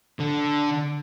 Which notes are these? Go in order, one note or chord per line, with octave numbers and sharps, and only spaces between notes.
D3